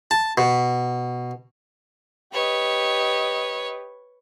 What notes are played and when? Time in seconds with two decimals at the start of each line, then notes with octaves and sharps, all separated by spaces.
0.11 A5
0.38 B2
2.33 G4 B4 C#5 D#5